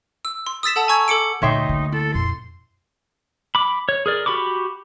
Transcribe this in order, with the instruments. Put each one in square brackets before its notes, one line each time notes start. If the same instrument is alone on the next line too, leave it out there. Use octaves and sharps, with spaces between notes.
[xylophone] E6
C6
D#6 E6 A6 B6 E7
A4 F#5 A5 D#6
G#5 A#5 C#6 E6 G#6
A4 D6 C#7 D7
[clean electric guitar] D2 C6 [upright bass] A#2 [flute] D#4 [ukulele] C#5 E5 G5
[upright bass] D3 A#3
[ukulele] E4 [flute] A4
[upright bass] F2 A#2 [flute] C6
[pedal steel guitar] B5 D6
C#5
G#4 A#4 D5
F#4 G4 B5 C#6 D6